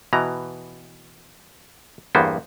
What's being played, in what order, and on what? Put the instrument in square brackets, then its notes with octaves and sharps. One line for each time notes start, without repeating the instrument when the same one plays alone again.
[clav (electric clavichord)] B2 E3 A#5
E2 G2 A#3 B3 C5